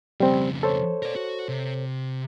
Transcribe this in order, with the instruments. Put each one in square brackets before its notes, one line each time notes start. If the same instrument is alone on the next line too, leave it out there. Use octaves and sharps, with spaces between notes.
[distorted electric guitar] F2 C#3 [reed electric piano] G3 C4
[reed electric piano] A4 C5 C#5
[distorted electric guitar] A#4 D5
F#4
C3